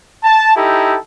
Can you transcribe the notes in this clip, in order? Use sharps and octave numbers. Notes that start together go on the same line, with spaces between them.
A5
D#4 E4 G4 A4